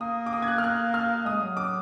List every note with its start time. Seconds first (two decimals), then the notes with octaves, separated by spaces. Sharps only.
0.01 A#3 D#6
0.26 D6
0.33 D#6
0.42 G#6
0.48 F#6
0.58 F6
0.64 F#6
0.94 F6
1.26 G#3 D#6
1.41 F#3
1.57 D6